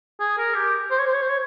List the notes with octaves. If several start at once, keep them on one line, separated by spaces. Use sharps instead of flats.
G#4
A#4
G4
C5
C#5
C5
C#5
C5
C#5